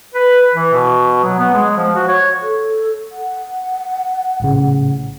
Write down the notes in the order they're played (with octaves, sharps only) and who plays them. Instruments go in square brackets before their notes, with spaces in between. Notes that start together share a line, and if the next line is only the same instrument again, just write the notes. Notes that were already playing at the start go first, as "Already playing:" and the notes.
[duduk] B4
E3
B2
F#3
B3
G#3
F3
F#4
C#5
[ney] A4
F#5
[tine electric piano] A#1 A2 C#3